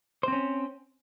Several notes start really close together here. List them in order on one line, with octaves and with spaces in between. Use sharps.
C5 C4 C#4